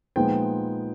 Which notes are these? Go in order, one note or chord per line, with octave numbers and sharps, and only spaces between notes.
A#2 F3 G#3 B3 D#4 G5